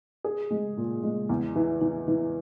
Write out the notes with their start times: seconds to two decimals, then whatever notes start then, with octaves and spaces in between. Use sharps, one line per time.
0.24 G#4
0.51 G#3
0.77 A#2
1.03 G#3
1.29 E2
1.56 E3
1.81 E3
2.08 E3